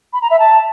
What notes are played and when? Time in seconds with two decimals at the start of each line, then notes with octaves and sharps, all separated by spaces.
0.13 B5
0.22 A#5
0.31 E5
0.39 A5